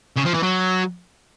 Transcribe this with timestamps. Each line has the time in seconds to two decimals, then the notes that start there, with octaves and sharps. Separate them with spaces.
0.17 C#3
0.26 F3
0.34 E3
0.43 F#3